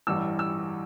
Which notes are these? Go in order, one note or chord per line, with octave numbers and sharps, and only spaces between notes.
A1 G2 E3 G3 E6
E6